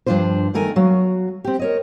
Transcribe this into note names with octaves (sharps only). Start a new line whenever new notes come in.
G2 F3 C#4 D4 F4 C5
E2 D#3 A3 A#4 C#5 G#5
F#3 F#4 F5
C4 G4
A#4 C#5 D#5